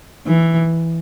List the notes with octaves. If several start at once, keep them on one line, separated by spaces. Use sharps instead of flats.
E3